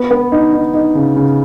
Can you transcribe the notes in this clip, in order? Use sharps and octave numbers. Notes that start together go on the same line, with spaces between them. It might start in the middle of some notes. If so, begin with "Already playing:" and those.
Already playing: B3
B3
D#4
D#4
D#4
C#3
C#3